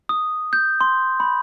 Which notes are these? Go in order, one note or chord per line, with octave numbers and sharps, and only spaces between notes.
D#6
G6
C6
B5